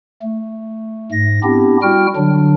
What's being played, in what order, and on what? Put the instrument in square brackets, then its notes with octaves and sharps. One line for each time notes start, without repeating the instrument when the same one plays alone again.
[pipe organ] A3
G#2 A#6
B3 C4 D4 E4 G4
G3 E4 F#4 G5 F6
D3 F#3 D4